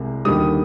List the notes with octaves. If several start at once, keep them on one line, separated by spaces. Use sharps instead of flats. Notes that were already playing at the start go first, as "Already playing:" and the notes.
Already playing: C2 C3 G#3
D#2 D3 G3 D#6